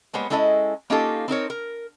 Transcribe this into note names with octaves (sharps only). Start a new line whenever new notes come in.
G3 G#3 A#3 B3 C5 C#5
G#3 C#4 E4 A4 D#5 G#5
A#3 C#4 D#4 F4 G4 A4
C4 D#4 A#4 C#5
A#4